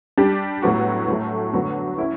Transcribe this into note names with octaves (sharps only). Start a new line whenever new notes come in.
G3 D4 G4
A2 F#3 B3 F#4
A2 F#3 A3
D3 F#3 B3 D4 F#4
C#4 E4